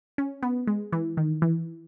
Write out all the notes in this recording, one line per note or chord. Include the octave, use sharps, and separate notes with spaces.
C#4
B3
G#3
E3
D#3
E3